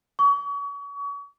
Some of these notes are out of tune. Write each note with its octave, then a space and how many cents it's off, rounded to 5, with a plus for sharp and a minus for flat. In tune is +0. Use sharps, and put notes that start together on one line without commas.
C#6 +35